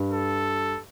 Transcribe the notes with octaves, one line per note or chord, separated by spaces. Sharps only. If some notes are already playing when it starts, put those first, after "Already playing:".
Already playing: G2
A4